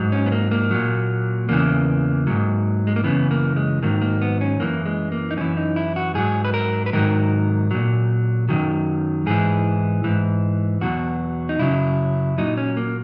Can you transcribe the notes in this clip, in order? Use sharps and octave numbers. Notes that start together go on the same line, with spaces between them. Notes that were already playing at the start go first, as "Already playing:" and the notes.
Already playing: G#2 F#3
C#4
B3
A#3
A#3
A#2 F#3
E2 C#3 E3 A#3
G#2 F#3
G#3
A#3
F#2 C#3 E3 B3
A#3
G#3
G#2 D#3 F#3 A#3
A#3
B3
C#4
F#2 E3 A#3
G#3
A#3
D#4
F#2 E3 C#4
D#4
E4
F#4
G#2 F#3 G#4
B4
A#4
B4
G#2 D#3 F#3 A#4
A#2 F#3
F#2 D#3 F#3
G#2 E3 G#4
G#2 E3
E2 B2 F#3 F#4
D#4
F#2 C#3 F#3 E4
A#2 F#3 D#4
C#4
A#3